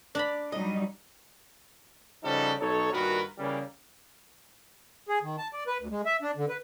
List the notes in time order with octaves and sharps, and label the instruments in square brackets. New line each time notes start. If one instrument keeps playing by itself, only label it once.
[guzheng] D4 A#5 B5 [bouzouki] D5
[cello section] F#3 G3 D#4 [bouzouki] D#5
[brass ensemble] C#3 F3 G3 D#4 F#4 A4
B1 D#4 A4 C#5
G2 A#2 D#3 F#4 A#4 B4
C#3 E3 G3 A#3
[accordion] G#4
D#3
A5
D5
B4
D2
G#3
E5
D4
D3
B4